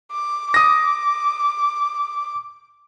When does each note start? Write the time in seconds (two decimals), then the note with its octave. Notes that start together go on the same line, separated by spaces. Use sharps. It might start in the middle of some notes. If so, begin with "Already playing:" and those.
0.11 D6
0.54 D6 D#6 A#6